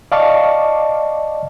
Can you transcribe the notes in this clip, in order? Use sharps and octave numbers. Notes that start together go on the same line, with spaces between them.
D5 D#5 F5 A5 C#6 D6